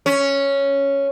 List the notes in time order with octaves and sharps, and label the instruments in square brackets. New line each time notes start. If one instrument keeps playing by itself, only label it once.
[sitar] C#4